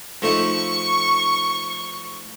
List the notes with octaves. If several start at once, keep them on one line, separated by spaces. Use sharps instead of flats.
F3 A3 D#4 C#6